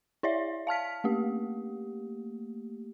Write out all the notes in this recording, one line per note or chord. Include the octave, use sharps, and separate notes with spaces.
E4 C#5 D5 E5
F5 A5 F6 B6
A3 A#3 G4